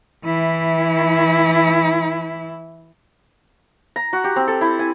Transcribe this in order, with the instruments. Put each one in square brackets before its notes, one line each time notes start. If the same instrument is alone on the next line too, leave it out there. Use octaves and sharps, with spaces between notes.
[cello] E3 E4
[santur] A#5
F#4
G4
C4
A4
E4
G#5